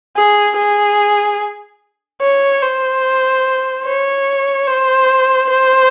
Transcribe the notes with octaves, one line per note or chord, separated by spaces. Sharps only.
G#4
G#4
C#5
C5
C#5
C5
C5